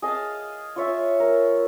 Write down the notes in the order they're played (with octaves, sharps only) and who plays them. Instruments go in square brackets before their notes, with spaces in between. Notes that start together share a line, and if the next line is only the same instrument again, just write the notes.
[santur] G#4 D#5 F5 A5
F4 C#5 E5
A#4